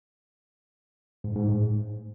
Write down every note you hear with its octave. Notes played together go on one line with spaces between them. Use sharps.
G#2
G#2
A2